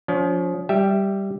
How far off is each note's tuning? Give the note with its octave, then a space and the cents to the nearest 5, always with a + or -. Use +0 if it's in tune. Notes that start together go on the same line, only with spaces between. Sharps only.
F3 +25 C#4 +45
G3 +0 G4 +0 E5 +0